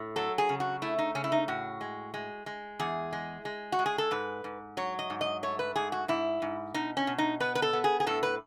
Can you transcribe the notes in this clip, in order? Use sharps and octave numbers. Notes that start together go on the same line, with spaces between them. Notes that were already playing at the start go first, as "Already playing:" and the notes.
Already playing: A2
F#3 A4
G#4
C#3
F#4
A3 E4
D#4
C#3 C#4
E4
D#4
A2 F#4
G#3
G#3
G#3
E2 G#4
G#3
G#3
F#4
G#3
G#4
A4
G#2 B4
G#2
F#3 C#5
D#5
G#2
D#5
A3 C#5
B4
G#2 G#4
F#4
G#2 E4
G#2
B2 D#4
C#4
B2
D#4
B3 B4
B4
A4
B3
G#4
G#4
A2 A4
B4